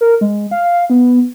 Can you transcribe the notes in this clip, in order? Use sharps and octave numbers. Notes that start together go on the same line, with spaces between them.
A#4
G#3
F5
F5
B3